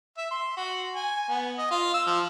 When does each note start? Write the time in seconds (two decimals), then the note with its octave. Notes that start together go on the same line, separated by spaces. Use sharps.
0.17 E5
0.31 C6
0.57 F#4
0.95 G#5
1.28 B3
1.58 D#5
1.71 F4
1.94 E6
2.07 F3